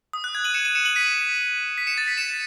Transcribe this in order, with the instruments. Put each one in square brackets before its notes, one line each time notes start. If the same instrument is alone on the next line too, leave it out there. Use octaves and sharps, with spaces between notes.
[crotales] D#6
F#6
G#6
D#7 F#7
C#7 E7
D#7 F#7
C#7 E7
D#7 F#7
B6 D#7
B6
C#7 E7
A6
B6
C#7 E7